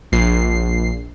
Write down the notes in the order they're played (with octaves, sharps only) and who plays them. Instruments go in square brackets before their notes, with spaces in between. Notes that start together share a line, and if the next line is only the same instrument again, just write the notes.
[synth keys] A#1 C7